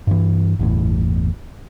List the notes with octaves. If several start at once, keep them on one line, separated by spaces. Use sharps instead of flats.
G2 E3
G1 E2 A2